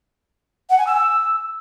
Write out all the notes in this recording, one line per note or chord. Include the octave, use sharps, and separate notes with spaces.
F#5
G#5
E6